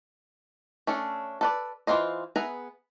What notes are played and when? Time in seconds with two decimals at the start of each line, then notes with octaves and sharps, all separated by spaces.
0.87 A3 C#4 D4 A4
1.41 A4 B4 D5
1.87 E3 D#4 F4 C5 D#5
2.36 B3 G#4 B4 E5 A#5